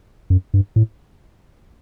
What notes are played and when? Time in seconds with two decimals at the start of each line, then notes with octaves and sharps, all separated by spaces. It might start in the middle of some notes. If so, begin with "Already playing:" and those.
0.30 F#2
0.54 G2
0.76 A2